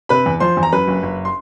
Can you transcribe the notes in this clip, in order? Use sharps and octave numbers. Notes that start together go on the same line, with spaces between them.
C3 B4 B5
E2
F3 C5 C6
E2
A#5
F#2 B4 B5
F#1
F#1
C6